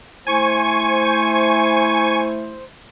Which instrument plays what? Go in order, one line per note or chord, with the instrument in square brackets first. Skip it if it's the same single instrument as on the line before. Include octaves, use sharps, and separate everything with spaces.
[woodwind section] A3 E4 C5 [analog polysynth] G#5 C#6